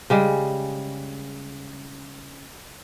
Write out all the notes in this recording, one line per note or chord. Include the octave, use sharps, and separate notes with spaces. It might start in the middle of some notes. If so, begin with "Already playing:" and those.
C#3 G3 G#3